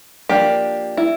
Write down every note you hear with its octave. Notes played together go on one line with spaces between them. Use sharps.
F3 A#3 D4 G4
E4